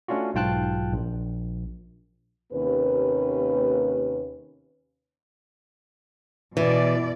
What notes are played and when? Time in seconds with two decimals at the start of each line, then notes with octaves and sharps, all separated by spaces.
0.08 A3 C#4 D4 F4 F#4
0.34 B1 G#2 F4 G5 A5 F#6
0.93 A#1
2.53 D#2 C3 A#3 C#4 B4
6.57 B2 E3 D5